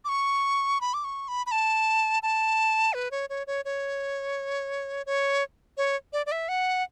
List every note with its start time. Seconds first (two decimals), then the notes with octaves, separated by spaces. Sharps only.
0.05 D6
0.09 C#6
0.81 B5
0.94 D6
1.04 C#6
1.28 B5
1.46 B5
1.52 A5
2.23 A5
2.93 B4
3.11 C#5
3.30 C#5
3.47 C#5
3.65 C#5
5.06 C#5
5.77 C#5
6.13 D5
6.26 D5
6.32 E5
6.49 F#5